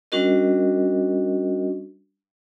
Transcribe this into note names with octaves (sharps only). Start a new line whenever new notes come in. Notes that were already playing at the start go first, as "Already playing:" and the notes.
G3 C#4 D4 F#4 A#4 D#5